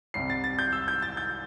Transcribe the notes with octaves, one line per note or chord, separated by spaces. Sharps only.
C2 C3 G3 C7
A6
A6
G6
E6
G6
A6
G6